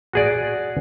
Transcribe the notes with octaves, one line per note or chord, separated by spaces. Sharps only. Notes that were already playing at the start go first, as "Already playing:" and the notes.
F#4 G#4 D5